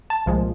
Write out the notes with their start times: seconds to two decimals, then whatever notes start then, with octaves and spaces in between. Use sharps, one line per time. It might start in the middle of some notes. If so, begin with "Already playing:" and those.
0.10 A5
0.26 C2 A#2 F3 G#3